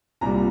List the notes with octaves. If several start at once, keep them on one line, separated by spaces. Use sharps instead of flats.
C2 A#2 G3 A#5